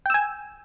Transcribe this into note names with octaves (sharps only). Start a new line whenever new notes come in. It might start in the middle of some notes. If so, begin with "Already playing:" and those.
G5 G#5 E6